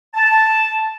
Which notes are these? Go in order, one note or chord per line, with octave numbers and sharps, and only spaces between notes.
A5